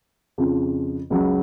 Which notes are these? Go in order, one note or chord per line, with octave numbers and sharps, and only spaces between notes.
F2 C#3 F3
C#2 C#3 F#3